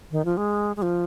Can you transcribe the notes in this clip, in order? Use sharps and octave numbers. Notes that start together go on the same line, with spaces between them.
D#3
F3
G#3
G#3
F3